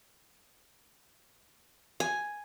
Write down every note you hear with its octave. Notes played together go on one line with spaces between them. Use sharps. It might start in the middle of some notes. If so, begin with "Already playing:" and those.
G#5